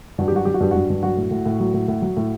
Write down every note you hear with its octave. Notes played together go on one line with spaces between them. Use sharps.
G2 F#4
G4
F#3 F#4
F#3 G4
F#4
G2 G4
G2 F#4
G2
F#3 F#4
A2
A2
A2
F#3
A2
A2
F#3
A2